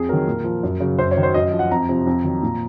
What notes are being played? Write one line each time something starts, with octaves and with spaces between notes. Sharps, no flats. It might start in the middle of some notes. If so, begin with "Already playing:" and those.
Already playing: F2 G#4
D#3 F#3 A#4
A#2
F3
F#2
C#3 F#3
F#2 C5
C#5
D#3 F#3
C5
F#2 D#5
F3
F#5
F2 A#5
C3 F3
F2
D#3 F#3
A#2